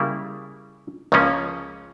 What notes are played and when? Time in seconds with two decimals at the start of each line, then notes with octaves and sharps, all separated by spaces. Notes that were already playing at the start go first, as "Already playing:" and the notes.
Already playing: C#3 G3 A#3 E4
1.12 C#2 C#3 F3 A#3 C#4